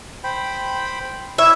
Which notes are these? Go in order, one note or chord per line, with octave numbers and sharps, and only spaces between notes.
C5 G5 B5
E4 C#5 E5